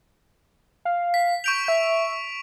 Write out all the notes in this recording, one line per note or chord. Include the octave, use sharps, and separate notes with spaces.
F5
B6
C#6 G6 D7 F7
E5